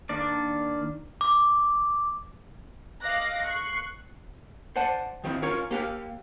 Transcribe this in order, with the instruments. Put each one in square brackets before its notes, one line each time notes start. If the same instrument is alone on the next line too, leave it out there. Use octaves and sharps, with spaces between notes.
[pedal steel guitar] D#3 A#3 D4 D5
[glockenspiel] D6
[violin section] D#5 F5 D6 F#6 A#6
C#6 F#6 C7
[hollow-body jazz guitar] C5 D5 F#5 A5
D#3 F3 C4 E4
C#4 F4 A#4 C#5
A#3 G4 F5